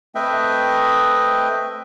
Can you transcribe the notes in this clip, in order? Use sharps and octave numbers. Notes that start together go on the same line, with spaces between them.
A3 C4 B4 D#5 E5 G5